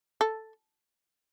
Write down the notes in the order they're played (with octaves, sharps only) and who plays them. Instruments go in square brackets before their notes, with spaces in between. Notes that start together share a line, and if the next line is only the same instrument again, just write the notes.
[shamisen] A4